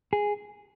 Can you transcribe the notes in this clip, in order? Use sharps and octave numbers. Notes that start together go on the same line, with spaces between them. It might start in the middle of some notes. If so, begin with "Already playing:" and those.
G#4